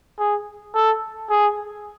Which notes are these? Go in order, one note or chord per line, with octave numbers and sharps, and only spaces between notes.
G#4
A4
G#4